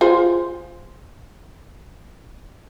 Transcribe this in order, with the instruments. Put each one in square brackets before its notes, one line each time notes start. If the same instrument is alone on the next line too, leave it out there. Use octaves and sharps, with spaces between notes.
[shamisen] F4 G#4 C5